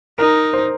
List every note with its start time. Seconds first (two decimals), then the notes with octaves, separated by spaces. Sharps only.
0.18 D#4 A#4
0.53 C5